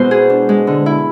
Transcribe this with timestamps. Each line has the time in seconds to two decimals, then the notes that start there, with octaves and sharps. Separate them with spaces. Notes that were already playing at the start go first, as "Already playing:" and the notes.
Already playing: B2 G#3 B3 E4 C5
0.11 G#4
0.30 D4
0.49 G#3
0.67 D3
0.86 E4